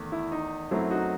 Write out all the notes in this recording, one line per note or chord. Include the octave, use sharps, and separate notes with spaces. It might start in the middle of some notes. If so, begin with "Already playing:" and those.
Already playing: E2 D#3 A3
E4
D#4
F#2 F#3 A3 C4 E4
D#4 F#4